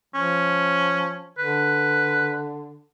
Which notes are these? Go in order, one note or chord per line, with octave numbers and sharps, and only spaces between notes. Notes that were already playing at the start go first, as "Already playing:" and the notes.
F3 C#4
D3 B4